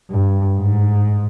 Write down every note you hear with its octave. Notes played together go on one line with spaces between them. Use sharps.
G2
G#2